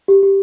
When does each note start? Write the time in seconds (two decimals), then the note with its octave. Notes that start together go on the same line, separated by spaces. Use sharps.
0.08 G4
0.23 G4